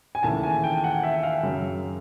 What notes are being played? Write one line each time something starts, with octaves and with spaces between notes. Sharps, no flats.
G#5
D#2 C#3 E3 A3 A5
G#5
G5
F#5
E5
F5
F#2 C#3 F#3